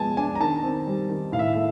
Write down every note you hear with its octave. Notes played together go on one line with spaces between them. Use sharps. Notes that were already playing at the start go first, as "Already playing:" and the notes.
Already playing: F3 G#3 B3 G#5 A5
D4 G#5
A#5
D#3 A5
C4
G3
D#3
A2 F5
E5
A3 E5